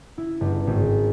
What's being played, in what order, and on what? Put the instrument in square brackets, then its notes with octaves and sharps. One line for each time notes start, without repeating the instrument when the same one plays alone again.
[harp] E4
G1
G#1